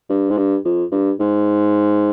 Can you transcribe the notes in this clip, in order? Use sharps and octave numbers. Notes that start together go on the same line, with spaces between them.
G2
G#2
G2
F2
G2
G#2